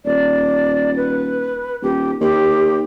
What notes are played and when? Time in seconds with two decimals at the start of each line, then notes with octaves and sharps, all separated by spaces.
0.05 D#1 D5
0.97 B4
1.82 D#1 G4
2.21 D#2 G4